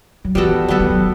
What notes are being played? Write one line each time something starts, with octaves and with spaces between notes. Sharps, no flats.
F#3
E3 G3 B3 F#4 A4
F#3 G3 B3 F#4 A4
E3
F#3